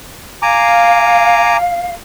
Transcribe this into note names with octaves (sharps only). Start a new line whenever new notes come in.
F5 G#5 A#5 D6